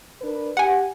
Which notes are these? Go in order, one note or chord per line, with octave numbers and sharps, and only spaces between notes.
D4 A#4 B4
G4 F#5 G#5